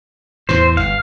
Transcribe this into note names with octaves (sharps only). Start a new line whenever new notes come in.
E2 A2 E3 C5
G1 F5